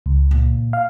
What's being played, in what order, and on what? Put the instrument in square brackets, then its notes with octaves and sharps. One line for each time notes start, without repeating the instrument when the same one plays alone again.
[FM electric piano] C#2
[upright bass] A#2
[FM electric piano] F5